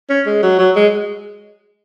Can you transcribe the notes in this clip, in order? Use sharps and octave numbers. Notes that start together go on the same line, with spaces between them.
C#4
G#3
F#3
F#3
G#3